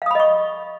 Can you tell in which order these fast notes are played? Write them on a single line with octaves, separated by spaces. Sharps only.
F5 D#6 B5 D#5 C#6